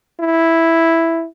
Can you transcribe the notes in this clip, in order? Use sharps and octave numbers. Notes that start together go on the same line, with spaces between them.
E4